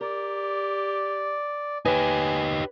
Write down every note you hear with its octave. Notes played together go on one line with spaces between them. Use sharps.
G4 A#4 D5
D#4 G4 B4 C#5 G#5